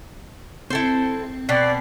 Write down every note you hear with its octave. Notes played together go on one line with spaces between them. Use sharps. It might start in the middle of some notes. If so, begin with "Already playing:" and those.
C4 E4 A4 C5
B2 C4 D5 B6 C7